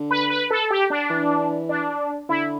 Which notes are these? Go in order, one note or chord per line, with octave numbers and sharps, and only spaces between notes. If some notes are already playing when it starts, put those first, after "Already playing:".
Already playing: D3
B4
B4
A4
G4
D4
E3
D4
D3 E4